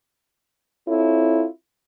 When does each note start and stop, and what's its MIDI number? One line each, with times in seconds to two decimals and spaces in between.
0.88 1.47 60
0.88 1.47 64
0.88 1.47 65
0.88 1.47 69
0.88 1.47 73